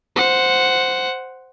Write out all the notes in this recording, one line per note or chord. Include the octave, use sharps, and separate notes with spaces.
C5 F#5